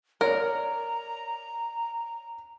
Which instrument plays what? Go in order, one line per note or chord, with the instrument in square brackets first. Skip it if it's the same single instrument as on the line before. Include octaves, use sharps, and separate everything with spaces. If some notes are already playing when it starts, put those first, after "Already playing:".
[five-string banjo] A#4 [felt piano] C#5 D5 [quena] A#5